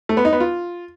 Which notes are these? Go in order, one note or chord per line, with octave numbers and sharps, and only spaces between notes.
A3
B3
D#4
B3
F4